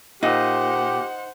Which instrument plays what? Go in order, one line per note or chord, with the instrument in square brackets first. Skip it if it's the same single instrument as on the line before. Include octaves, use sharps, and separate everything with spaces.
[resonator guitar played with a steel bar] A#2 [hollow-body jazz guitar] D#4 [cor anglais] G4 [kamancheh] C5 F#5